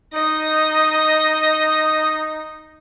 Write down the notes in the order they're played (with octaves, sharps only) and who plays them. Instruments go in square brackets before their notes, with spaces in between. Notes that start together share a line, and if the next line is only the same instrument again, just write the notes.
[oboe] D#4 [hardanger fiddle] D#5